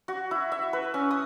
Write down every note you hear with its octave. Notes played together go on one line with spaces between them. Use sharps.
F#4
E4
E5
B4
C#4
D#6